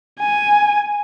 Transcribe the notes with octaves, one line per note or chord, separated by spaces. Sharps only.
G#5